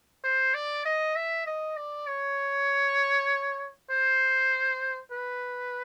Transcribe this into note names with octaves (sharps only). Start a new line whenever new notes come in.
C5
D5
D#5
E5
D#5
D5
C#5
C5
B4